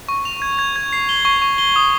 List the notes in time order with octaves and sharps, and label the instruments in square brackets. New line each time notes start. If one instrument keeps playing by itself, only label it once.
[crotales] C#6
F7
G#6
G#6
G#6
C7
G7
C#6
C#6
G7
D#6